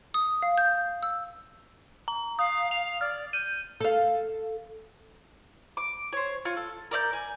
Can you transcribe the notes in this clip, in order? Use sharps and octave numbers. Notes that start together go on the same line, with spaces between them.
D#6
F5
G6
E6
A#5
F5 D#6
F5 F7
D5 F6
G6 D#7
A4 F5
D6
C5 C#5
F4 C#5
A4
A#4 D5 E5 G6
G#5